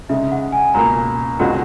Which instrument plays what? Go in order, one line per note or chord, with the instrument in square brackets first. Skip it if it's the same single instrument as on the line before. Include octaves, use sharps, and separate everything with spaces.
[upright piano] C#3 G#3 D#4 [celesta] E5
[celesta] F#5
G#5
[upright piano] C#2 B2 A#3 [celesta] A#5
[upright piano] C#2 B2 G#3 D#4 F#4 [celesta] F#5